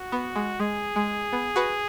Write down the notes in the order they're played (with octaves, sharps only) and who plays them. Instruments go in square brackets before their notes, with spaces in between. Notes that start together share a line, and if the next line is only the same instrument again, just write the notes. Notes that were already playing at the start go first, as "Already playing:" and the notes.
Already playing: [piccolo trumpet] F#4
[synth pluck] B3
G#3
[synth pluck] G#3 [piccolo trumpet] G#4
[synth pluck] G#3
B3
F#4 B4